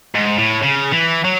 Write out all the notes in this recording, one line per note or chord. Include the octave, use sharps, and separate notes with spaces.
G#2
A2
C#3
E3
F#3